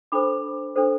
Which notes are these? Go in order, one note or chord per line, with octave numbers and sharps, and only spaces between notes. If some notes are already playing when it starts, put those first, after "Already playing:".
D4 A4 C5 B5 D6
D4 A4 C5